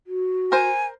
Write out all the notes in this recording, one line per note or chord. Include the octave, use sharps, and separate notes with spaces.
F#4
A#4 C5 G#5